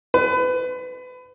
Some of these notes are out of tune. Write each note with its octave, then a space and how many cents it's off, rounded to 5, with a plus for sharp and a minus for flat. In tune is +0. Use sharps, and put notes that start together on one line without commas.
B4 +30